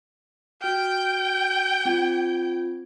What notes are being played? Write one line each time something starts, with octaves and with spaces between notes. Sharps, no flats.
F#4 G5 F6
C4 F4 G#6